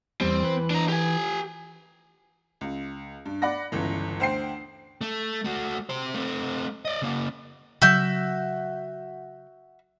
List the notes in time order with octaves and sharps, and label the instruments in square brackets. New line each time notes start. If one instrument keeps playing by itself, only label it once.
[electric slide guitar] E2 G3 [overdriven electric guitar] C4
[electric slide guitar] E3 B4
[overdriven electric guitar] D4 A#5
G4 G#5
[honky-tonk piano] C#2
G2
D5 F#5 B5 A#6
G1 C#2 E3
D2 C5 G5 C7
[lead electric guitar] A3
A3 F#4
G4 C5
A3 C4
D5 D#5
C#3 A#3
[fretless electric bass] C#3 F#3 [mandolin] F#4 E5 G6